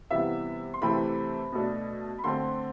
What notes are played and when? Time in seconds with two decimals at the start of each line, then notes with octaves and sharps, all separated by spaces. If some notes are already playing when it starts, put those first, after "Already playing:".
0.10 C3 E3 G3 B3 E5
0.74 C6
0.81 C3 E3 A3 C4 B5
1.52 B2 A3 D4
2.18 B5
2.24 D3 A3 C4 C6